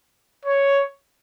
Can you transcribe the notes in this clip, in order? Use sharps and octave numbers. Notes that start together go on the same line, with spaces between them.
C#5